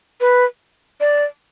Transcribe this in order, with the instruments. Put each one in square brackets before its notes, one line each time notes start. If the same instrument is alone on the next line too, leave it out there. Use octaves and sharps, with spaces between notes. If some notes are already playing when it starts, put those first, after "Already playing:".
[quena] B4
D5